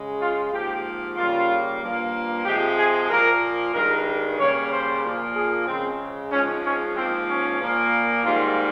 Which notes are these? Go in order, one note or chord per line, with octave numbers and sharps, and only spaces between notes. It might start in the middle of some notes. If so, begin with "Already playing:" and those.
Already playing: C#3 G#3
F4
G#2 F3 A#3 G4
C#3 G3 A#3 F4
G2 F3 A#3
C3 F3 G#3 G4
G#4
A#2 F3 A#3 A#4
G2 D#3 G#3 A#4
C#3 G3 A#3 C#5
C5
A#2 F3 A#3
G#4
C#3 G#3 C4
G#2 F3 G#3 C#4
C#4
G#2 F3 A#3 C4
C#4
A#2 F3 A#3
G#2 D#3 G3 A#3 F4